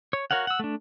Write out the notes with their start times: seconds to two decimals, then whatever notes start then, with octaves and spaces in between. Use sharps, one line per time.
0.13 C#5
0.31 F#4 A#4 C#5 F5 F#5
0.47 F#5 E6
0.59 A3 D4